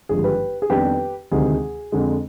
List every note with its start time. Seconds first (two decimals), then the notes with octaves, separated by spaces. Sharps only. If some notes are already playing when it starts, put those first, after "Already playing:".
0.09 G#1 G2 D3 F3 G#3 G#4
0.24 G4 B4
0.62 G#4
0.70 F2 D#3 G3 B3 D4 G4 B4
1.31 D2 C3 D#3 G#3 G#4
1.92 F2 D3 G#3